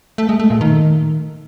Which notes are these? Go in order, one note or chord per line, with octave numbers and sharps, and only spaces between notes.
A3
G#3
A3
A#2
D#3